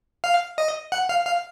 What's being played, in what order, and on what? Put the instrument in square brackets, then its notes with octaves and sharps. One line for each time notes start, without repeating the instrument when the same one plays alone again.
[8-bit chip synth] F5
D#5
F#5
F5
F5